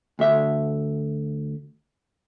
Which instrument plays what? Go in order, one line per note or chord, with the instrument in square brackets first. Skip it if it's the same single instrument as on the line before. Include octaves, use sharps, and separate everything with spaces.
[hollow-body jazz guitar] D2 E5